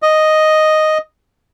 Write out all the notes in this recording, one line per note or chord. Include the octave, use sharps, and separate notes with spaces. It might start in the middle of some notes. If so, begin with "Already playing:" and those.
D#5